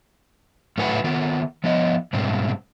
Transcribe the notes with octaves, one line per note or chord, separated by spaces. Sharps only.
A2 F#3 A4 B4 F#5 G#5
D#3 B3 F4
F3 B3 D#5
G#2 B2 G3 C4